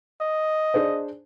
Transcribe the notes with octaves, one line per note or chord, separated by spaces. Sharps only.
D#5
D4 G#4 C5